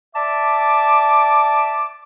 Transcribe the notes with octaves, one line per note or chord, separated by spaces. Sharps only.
D5 E5 A5 D6